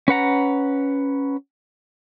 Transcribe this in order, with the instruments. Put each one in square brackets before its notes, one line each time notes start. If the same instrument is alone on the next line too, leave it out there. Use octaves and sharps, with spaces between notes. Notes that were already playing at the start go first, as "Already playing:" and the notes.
[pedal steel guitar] C#4 B4 F#5 A#5